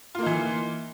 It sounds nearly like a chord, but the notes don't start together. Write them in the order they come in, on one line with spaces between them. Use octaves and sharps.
F4 A#3 D#4 E3